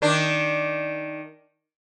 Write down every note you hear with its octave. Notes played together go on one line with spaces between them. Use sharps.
D#3 D4